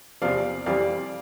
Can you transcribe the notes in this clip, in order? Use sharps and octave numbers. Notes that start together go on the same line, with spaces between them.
E2 C3 F3 D5 F5
F2 E3 G3 D5 F5